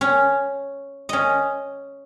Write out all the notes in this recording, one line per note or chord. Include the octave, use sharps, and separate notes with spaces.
C#4
C#4 D#5